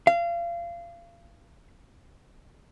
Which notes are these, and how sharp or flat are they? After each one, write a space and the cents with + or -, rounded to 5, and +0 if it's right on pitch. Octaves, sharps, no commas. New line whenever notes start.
F5 -30